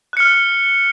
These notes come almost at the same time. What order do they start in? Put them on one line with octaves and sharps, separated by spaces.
F#6 C#7 F6